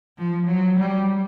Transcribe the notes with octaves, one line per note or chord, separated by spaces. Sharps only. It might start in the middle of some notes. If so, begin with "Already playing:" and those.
F3
F#3
G3